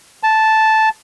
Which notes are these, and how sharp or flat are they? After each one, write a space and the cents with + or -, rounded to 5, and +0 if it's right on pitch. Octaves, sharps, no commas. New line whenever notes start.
A5 -5